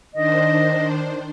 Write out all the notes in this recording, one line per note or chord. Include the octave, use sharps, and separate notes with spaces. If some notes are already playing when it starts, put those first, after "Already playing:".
D#3 D4 C5 D#5